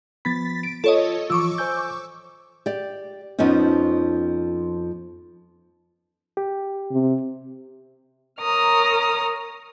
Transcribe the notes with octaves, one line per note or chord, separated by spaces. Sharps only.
F3 B3 B5 A6 B6
D7
F4 A4 C#5 D#5
E3 F3 F4 C#6 D6 E6
C5 G#5 G6
G4 D5
F2 F3 B3 C#4 D#4
G4
C3
A#4 C#5 A#5 D#6 F6